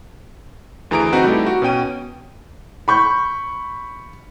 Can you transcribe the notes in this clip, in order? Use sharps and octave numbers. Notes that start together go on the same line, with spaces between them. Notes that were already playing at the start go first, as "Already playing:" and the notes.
D2 E3 G#4 A#5 D#6 D7
C4 D#4 F#4 B4
G3 A3 D#4 E4 G4
F#4
B2 C#4 G5 D#7
B5 C#6 G6